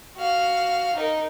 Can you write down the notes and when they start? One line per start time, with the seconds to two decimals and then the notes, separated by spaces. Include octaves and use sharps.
0.17 F#4 F5
0.96 D#4 A#4